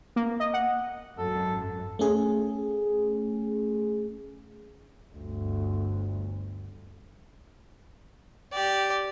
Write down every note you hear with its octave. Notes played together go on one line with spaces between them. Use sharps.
A#3
D#5
F#5
G#1 F#2 A4
A3 C#4 G#4
G1 D2
G4 D5